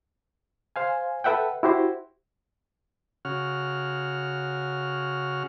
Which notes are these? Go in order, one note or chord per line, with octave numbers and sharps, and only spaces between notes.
C5 F5 G#5
A4 B4 E5 F#5 G5
E4 F#4 G4 C5
C#3 F#4 F6